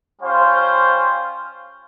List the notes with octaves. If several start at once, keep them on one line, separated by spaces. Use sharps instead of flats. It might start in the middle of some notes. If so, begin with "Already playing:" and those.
G3 C#4 F4 C5 F5